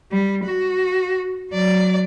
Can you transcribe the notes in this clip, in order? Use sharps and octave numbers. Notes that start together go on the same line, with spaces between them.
G3
F#4
F#3 D5